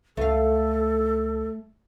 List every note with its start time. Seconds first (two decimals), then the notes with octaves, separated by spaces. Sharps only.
0.17 C#2 A3 A4 F5